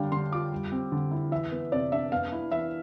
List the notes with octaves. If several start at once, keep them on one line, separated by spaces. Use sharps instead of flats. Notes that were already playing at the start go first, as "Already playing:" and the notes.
Already playing: D3 G3 D4 F5 G5
D3 C6
F4 D6
G3
C4
D3
E4
E3 E5
B3
C3 D5
D4 E5
B3 F5
E4
E3 E5